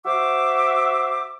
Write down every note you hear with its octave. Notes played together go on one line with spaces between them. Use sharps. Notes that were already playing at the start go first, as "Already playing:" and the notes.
F#4 C5 E5 D6